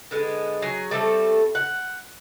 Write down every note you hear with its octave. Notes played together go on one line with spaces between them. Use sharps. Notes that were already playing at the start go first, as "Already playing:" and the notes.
D3 G#3 B3
F#3 G#4
G3 A3 C4 A4
F#5